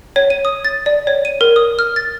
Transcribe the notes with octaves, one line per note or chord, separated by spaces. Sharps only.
C#5
D#7
D#6
A6
D5
C#5
D#7
A#4
D#6
F6
A6